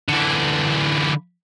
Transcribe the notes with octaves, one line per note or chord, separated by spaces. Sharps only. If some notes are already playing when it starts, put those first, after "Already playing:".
D3 E3